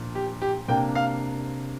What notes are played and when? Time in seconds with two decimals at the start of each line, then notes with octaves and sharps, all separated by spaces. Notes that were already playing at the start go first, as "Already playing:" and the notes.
Already playing: A#2 F3 D4
0.15 G4
0.42 G4
0.68 C3 A#3 D4 G5
0.95 F5